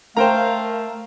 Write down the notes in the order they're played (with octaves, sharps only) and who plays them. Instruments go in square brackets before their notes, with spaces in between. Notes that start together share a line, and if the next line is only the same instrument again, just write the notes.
[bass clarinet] A3 [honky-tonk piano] A#4 [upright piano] C5 G5 A#5 [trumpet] F5